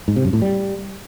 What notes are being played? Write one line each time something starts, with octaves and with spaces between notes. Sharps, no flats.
G#2
C3
F#2
A2
G3